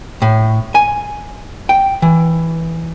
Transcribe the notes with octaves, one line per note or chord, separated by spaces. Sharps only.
A2
G#5
G5
E3